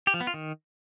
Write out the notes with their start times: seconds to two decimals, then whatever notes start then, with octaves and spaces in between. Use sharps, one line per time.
0.07 G4
0.14 F3
0.21 B3
0.27 F4
0.34 D#3